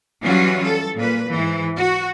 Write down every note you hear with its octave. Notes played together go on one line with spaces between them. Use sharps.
E3 F#3 G3 C#4 F4 F#4
A4
A#2 B4
G#2 E3
F#4